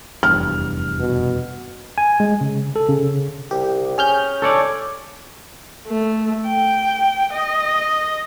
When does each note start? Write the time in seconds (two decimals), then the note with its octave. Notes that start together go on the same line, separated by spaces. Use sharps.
0.23 F1 E2 G2 F6
1.00 B2
1.98 G#5
2.20 G#3
2.41 C#3
2.76 A4
2.89 C#3
3.51 C2 G4
3.98 C#4 G#4 F6 G6
4.42 A4 C#5 D5
5.87 A3
6.48 G5
7.33 D#5